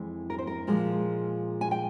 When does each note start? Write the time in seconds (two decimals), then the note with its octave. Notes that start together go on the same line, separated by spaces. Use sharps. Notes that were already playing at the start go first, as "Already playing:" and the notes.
Already playing: F2 E3 G#3
0.30 A#4
0.38 C5
0.47 A#4
0.67 A#2 F3 G#3
1.61 G#5
1.71 G5